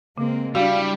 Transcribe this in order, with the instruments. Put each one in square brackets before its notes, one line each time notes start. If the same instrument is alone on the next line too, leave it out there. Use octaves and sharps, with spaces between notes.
[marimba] C#3 [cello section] G#3 A#3 C4
[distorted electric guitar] G3 [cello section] D4 E4 [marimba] F#4 [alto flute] F5